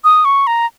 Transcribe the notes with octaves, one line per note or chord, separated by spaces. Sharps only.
D#6
C#6
A#5